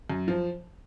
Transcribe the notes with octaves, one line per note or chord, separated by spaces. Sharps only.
F#2
F3